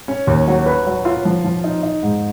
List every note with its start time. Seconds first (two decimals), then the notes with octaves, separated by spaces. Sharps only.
0.08 C#4
0.27 D#2
0.48 F#3
0.66 B4
0.86 F#3
1.05 F4
1.25 F3
1.44 F3
1.64 D#4
1.83 D#4
2.03 G#2